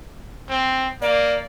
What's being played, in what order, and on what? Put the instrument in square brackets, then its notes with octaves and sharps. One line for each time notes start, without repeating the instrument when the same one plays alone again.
[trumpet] C4
[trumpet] A#3 [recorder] D5